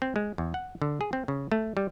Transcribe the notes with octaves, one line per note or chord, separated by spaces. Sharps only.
C4
G#3
E2
F#5
D3
G#4
C4
C#3
A3
G3